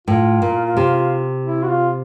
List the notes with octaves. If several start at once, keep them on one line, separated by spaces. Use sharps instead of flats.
A2 F4
A#2
C3
E4
F#4
F4